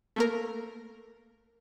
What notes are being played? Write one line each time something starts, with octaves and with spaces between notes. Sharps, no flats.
A3 A#3 A#4